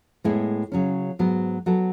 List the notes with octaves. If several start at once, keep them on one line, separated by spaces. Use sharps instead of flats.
A2 G#3 B3 E4
C#3 F#3 C#4
G#2 F#3 B3 F#4
F#3 B3 F#4 A4